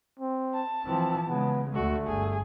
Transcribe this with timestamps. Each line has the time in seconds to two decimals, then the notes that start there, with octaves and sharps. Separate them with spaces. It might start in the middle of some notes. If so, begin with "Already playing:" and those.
0.20 C4
0.54 A5
0.85 E3 F3 C4
1.28 C#3 G#3 B3
1.75 D2 D3 A3 F#4
2.07 G1 G#4